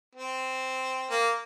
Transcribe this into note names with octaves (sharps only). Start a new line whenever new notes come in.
C4
A#3